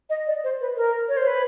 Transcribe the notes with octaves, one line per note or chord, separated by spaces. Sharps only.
D#5
D5
C5
B4
A#4
C#5
C5
B4